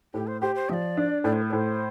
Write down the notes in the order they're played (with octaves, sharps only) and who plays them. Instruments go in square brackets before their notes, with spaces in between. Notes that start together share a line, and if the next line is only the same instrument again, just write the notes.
[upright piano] A2 [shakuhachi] G4
[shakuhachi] C5
[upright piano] G4 [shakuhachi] C5
[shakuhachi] C5
[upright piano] F3 [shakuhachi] D5 E5
[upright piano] D4
[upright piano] A2 [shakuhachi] D5
[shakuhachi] C5
A4
[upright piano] A2 [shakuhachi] C5 D5